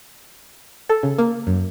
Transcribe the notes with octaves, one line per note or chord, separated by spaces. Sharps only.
A4
C#3
A#3
F#2